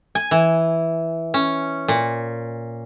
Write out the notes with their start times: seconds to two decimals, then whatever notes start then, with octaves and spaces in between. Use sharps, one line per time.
0.15 G#5
0.31 E3
1.34 C#4
1.88 A#2